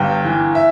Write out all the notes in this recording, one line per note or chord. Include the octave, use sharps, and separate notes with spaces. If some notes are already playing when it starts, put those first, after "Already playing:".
Already playing: G1 G2 G5
E3
E5